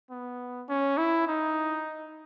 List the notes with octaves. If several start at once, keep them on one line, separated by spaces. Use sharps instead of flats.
B3
C#4
E4
D#4